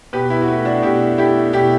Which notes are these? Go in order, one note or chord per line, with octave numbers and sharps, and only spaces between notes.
B2 G4 B4
E4
F#4
A3 E4
D4 F#4
B2 E4 G4
A3 E4 G4
B2 E4 G4